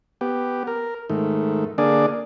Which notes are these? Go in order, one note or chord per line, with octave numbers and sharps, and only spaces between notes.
B3 G4
A#4
G#2 D#3 A3
D3 A#3 D4 G#4 D5